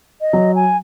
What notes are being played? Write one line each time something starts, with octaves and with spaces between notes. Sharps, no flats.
D#5
F#3
G#5